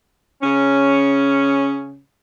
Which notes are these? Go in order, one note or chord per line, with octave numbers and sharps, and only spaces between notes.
C#3 C#4